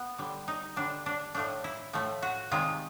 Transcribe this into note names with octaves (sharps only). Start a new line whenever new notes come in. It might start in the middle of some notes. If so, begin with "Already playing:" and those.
Already playing: B3
D3 G3
D#4
D3 G3 D4
D4
A2 F3 A3 D4
E4
A2 F3 A3
F#4
C3 D#3 G#3 F4